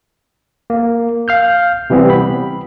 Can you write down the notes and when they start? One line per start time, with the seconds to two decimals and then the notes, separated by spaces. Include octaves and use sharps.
0.70 A#3
1.28 F5 F6 G6
1.90 C3 E3 G3 B3 C4
2.10 B5